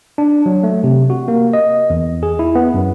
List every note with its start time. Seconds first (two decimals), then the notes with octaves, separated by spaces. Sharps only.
0.18 D4
0.46 F#3
0.64 A3
0.84 C3
1.10 F#4
1.28 A#3
1.53 D#5
1.90 E2
2.23 G#4
2.39 E4
2.55 B3
2.74 F#2